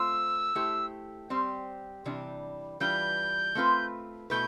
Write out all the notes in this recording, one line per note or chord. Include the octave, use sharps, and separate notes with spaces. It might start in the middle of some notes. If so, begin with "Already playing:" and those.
Already playing: A3 C4 F4 C5 E6
A3 E4 G4 C5
G3 C4 G4 C5
C3 E3 G3 D4
E3 G3 D4 F4 B4 G6
A3 C4 F4 B4
B2 A3 E4 B4 G6